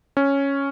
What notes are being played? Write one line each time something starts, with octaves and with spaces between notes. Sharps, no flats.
C#4